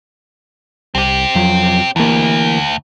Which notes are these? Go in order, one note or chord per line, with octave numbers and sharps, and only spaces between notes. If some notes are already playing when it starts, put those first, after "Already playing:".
C2 C4 G4
F2 F3 F#3
D2 E3 A#3